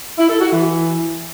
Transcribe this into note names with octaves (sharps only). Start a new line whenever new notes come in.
E4
A4
F#4
E3